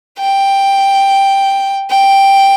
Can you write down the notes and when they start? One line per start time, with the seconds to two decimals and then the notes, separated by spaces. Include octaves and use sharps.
0.20 G5
1.90 G5